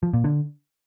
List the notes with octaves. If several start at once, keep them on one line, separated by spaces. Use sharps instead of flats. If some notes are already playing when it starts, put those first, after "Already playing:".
F3
A#2
D3